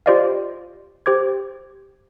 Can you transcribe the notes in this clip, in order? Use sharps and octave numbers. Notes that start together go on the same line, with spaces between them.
F4 G4 C5 D5 D#5 F5
G4 C5 D6 G#6